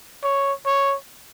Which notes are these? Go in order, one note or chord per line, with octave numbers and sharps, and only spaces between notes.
C#5
C#5